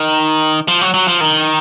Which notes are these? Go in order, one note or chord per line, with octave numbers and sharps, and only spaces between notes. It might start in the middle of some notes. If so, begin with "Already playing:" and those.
Already playing: D#3
F3
F#3
F#3
F3
D#3